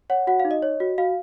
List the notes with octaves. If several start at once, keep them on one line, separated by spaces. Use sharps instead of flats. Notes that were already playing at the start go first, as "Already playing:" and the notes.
C#5 F#5
F#4 F#5
F5
D#4
D#5
C#5
F#4
F#4 F5